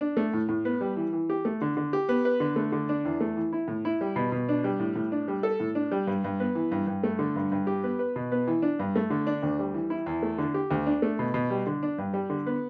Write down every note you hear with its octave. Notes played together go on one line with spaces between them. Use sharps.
D4
A3
A2
A2
B3
G3
E3
E3
G4
A3
D3
D3
G4
B3
B4
D3
A3
D3
D4
E2
A3
E3
E4
A2
E4
G3
B2
B2
D4
G3
A2
A2
D4
G3
A4
A2
D4
G3
G2
G2
B3
E3
G2
G2
A3
D3
G2
G2
G4
B3
B4
B2
B3
E3
D4
G2
A3
D3
D4
D2
G3
E3
E4
E2
A3
D3
G4
D2
D4
A3
B2
B2
G3
D3
D4
G2
G3
D3
B3